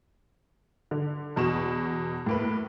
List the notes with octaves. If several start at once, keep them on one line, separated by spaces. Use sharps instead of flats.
D3
E2 B2 C#6 E7
A2 A#3 B4